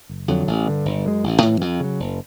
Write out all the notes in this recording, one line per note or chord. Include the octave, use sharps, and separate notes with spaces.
F#1
F2 D3 F#3
A1
G2 D3
G1
F#2 D#3 G#3
A1
A2 E3
F2
C#3 F#3
F#1